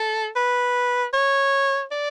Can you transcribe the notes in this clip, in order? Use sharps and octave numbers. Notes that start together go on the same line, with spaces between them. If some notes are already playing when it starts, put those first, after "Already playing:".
Already playing: A4
B4
C#5
D5